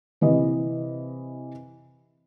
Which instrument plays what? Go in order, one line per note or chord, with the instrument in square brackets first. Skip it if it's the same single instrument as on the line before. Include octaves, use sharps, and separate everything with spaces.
[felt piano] C3 E3 D#5